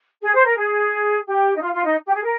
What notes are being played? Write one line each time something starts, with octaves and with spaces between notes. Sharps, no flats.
G#4
C5
A#4
G#4
G4
D#4
F4
F4
D#4
G4
G#4
A#4